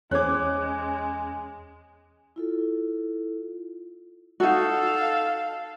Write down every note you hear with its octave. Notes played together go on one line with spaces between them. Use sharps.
E2 G#3 C#4 C5 C#5 D6 F#6 G#6
E4 F4 A4
D#4 F#4 A4 F5